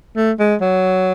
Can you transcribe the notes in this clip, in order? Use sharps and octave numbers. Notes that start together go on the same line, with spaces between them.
A3
G#3
F#3